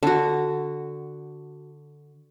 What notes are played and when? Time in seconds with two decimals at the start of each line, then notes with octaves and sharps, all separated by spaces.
0.03 D3 F#4